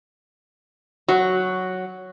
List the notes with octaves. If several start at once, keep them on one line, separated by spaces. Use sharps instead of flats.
F#3 F#4